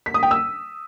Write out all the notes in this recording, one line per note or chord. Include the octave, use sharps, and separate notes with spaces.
B6
D#6
G5
E6